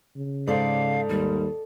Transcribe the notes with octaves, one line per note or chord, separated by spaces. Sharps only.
C#3
G#2 A4 C5 D5 F5
D#2 G3